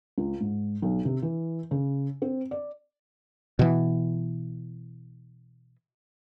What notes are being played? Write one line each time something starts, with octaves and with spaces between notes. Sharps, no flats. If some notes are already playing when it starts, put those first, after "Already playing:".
C#2
G#2
B1
C3
E3
C#3
C4
D5
B2 E3